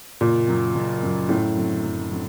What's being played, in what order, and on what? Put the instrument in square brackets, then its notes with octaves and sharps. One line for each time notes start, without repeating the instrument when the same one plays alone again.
[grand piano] F#1 [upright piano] A#2
[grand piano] F#2 F#3
F#1
F#2 F#3
[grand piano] F#2 [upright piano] A2
[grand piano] D3 F#3 C4
F#2
D3 F#3 C4